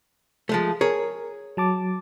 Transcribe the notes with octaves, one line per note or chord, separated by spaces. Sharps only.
F3 G#3 A3
G#4 A#4 C#5
F#3 A5 D6